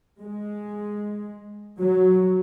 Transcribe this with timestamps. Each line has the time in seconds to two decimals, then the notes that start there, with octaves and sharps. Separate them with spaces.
0.21 G#3
1.80 F#3